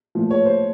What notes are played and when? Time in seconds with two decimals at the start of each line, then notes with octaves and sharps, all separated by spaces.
0.15 A#2 F3 A3
0.31 C#5
0.46 C5